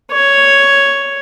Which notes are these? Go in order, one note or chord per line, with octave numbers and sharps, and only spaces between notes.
C#5